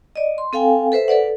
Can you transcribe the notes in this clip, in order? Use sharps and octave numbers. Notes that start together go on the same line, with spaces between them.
D5 D#5
C6
C4 A4 F5 G5 G#5
A4 B4 C5 E5
A4 B4 D5 F#5